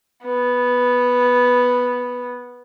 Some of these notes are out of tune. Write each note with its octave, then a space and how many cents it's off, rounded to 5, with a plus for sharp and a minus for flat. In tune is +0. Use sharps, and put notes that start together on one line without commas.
B3 -5